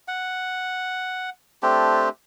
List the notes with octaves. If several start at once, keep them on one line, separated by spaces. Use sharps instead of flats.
F#5
A3 C4 D4 G4